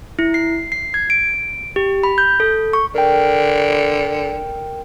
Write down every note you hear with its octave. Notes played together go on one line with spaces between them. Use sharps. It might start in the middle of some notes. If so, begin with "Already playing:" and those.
E4
C7
C7
G#6
D7
G4
B5
G6
A4
C#6
D3 A#4 G5